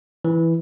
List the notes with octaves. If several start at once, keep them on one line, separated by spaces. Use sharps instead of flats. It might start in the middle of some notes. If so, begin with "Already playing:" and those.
E3